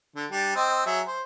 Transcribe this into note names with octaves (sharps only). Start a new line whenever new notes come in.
D3
G3 D4
C4 D#5 E6
F#3 G#4 E5
C5